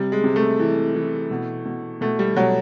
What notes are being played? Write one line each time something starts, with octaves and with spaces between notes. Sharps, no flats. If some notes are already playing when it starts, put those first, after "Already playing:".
Already playing: C3 G3
G#3
C3
A3
E3
E3
B2
B2
B2 A3
G3
B2 F#3